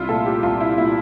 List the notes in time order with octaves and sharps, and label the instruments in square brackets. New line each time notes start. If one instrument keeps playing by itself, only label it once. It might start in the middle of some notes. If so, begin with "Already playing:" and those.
Already playing: [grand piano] C2 [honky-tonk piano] E4 F4
[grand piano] A#2 A3 [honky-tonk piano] A4
[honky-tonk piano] G4
[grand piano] C2 [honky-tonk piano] F4
[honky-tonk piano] E4
[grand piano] A#2 A3 [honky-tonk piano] E4